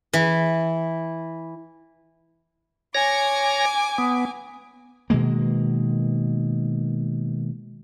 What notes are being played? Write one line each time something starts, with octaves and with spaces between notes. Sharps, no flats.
E3
C#5 G#5 D6 A#6
B3
B2 D#3 G#3 A#3